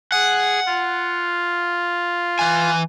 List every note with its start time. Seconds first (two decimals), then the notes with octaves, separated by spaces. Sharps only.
0.12 G#4 F#5
0.67 F4
2.39 E3 G#5